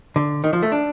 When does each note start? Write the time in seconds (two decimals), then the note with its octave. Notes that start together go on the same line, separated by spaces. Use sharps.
0.16 D3
0.44 D#3
0.53 F3
0.62 A3
0.72 D4